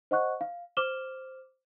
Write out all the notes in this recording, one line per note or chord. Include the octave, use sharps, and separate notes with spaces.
C5 D#5 F#5 C#6 F#6
F5
C5 D6 F6 E7 G7